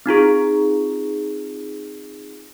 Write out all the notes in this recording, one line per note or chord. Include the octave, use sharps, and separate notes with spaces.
C4 D#4 F4 G#4